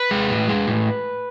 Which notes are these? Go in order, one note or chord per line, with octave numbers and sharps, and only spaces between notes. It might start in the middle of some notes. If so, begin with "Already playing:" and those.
Already playing: B4
G#3
A2
G#3
A2